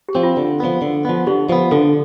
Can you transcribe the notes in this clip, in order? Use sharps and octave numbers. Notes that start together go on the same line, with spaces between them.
G4
F3 C4
F4
D3
F3 B3
D3
F3 B3
D3 G4
F3 B3
D3 A4